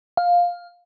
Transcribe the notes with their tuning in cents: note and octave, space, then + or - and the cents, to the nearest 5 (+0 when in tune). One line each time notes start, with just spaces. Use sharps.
F5 +10